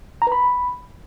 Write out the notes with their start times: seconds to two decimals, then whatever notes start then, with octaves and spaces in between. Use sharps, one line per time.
0.22 A#5
0.27 B4
0.32 B5